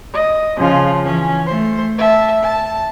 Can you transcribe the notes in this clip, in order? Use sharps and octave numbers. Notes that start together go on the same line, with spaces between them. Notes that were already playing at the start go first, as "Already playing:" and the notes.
D#5
C#3 F3 F4
E3 C#4
A3 C5
E5 A5
A5